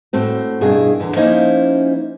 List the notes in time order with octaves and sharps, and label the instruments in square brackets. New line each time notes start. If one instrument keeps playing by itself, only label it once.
[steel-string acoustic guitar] A2 A3 C4 F#4
G2 B2 E4 G#4 A#4
E2 D3
F3 A#3 C#4 D#4 E4 C5